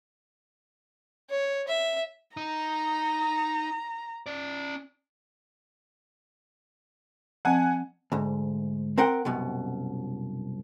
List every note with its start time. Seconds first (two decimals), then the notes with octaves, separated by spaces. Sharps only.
1.30 C#5
1.68 E5
2.37 D#4 A#5
4.26 C#4 D5
7.45 F3 C4 F#5 G#5
8.12 D2 G#2
8.98 C4 A#4 F#5 G5
9.25 C2 F#2 B2